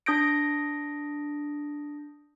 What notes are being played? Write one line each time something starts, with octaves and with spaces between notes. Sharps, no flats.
D4 D#6 G6 A#6 D7